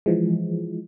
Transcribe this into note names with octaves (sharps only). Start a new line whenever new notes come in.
E3 F3 G#3